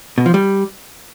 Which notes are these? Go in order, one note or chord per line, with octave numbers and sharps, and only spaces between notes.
B2
F3
G3